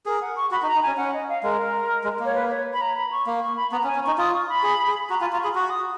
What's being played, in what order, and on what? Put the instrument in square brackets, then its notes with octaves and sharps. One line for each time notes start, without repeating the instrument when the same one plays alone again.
[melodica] G#4 [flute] A#4
[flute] F#5
C#6
[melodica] F#4 [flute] B5
[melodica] D#4
[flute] A#5
[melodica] D#4
[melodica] C#4 [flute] G#5
[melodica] C#4 [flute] F#5
[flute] D#5
F5
[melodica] G#3 [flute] A#4
[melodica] G#3
[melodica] A#3 [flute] C#5
[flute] B4
C#5
B5
A#5
B5
C#6
[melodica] A#3
[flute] C#6
B5
[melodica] B3 [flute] A#5
[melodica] C#4
[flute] G#5
[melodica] C#4
[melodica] D#4 [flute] C#6
[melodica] F4 [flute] D#6
[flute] C#6
B5
[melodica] G#4
G#4
[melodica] F#4 [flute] A#5
[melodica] F4 [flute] G#5
[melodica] F4 [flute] A#5
[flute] C#6
[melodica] G#4 [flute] B5
[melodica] F#4 [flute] C#6
[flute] D#6